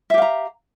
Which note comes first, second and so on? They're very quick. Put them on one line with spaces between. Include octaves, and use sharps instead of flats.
E5 G4 F5 A#5